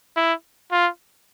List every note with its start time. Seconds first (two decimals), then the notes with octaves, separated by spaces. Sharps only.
0.17 E4
0.72 F4